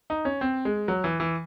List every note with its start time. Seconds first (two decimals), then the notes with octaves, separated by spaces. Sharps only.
0.10 D#4
0.25 C#4
0.41 C4
0.65 G#3
0.88 F#3
1.04 E3
1.20 E3